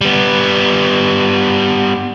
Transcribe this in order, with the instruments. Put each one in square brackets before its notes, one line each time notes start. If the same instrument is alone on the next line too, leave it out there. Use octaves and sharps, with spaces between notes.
[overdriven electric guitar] G3 B3